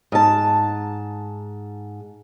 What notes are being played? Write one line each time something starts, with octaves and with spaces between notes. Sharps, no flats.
G#2 A5